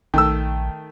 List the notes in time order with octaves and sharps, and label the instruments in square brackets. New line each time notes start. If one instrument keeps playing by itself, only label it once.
[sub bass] A#1 [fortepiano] D#3 A3 E6